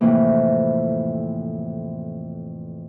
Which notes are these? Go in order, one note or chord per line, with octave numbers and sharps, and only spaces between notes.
F2 A2 C3 E3 A#3